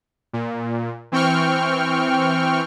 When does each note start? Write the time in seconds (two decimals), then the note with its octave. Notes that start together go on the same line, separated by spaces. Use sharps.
0.33 A#2
1.12 E3 C4 G5 C#6 F6